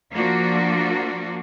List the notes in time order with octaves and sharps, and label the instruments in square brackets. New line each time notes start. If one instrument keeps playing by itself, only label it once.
[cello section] F3 A#3 D4 F4 F#4